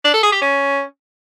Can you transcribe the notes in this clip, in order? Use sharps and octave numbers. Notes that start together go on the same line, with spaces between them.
D4
A4
G#4
G4
C#4